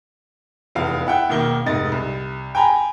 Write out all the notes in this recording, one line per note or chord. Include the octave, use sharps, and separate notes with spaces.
F1 E2 F5
E4 F#5 G5
E1 D#3 A#3 G7
F1 G#2 D#5 A6
C2
G5 G#5 A#5 B5